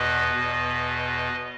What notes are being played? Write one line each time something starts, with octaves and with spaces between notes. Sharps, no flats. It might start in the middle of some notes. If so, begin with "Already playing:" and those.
Already playing: E2 B2 B4 D#5
E2 B2